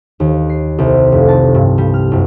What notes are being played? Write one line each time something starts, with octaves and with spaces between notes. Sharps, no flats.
D#2
C7
C2
F1
A5
G2
G3
F6
F#1